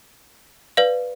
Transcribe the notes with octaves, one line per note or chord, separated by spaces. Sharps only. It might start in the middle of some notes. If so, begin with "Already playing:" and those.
B4 D5 F5